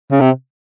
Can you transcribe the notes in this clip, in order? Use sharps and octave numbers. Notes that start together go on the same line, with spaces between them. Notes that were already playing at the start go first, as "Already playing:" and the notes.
C#3
C3